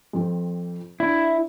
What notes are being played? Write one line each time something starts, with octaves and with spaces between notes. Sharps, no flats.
F2 C4
D4 E4